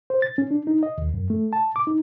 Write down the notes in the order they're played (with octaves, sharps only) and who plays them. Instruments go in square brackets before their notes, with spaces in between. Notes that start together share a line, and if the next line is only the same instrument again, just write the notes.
[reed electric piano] C5
A6
C#4
D4
D#4
D#5
D#2
F#2
A3
A5
D6
D#4